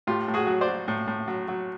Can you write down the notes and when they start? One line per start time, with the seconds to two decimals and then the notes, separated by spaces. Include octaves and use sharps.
0.07 A2 F4 G4
0.28 A2
0.34 F#4 G#4
0.47 F#3
0.61 C5 D5
0.68 F#3
0.88 A2
1.07 A2
1.28 F#3
1.48 F#3